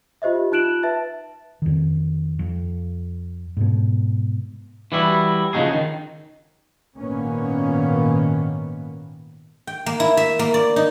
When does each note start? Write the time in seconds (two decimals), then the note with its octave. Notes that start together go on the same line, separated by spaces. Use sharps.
0.22 F4 G4 C5 D#5 E5
0.52 D#4 F4 F#6 D7 E7 F#7
0.83 B4 E5 A5 A6
1.62 F2 D#3
2.39 F2
3.57 G#2 B2
4.92 E3 G3 E4 F#4
5.53 C#3 F3 D#4 F#4 G#4
5.73 D#3
6.96 G#1 A#2 D#3 A#3 B3 C#4
9.67 G5
9.86 A#3
10.00 E4
10.17 E5
10.39 A#3
10.54 D5
10.76 D#4